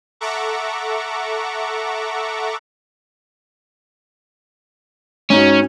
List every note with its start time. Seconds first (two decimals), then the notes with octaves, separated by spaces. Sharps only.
0.21 A4 E5 F#5 A#5 C#6 D6
5.30 G#2 C#4 D#4 F#4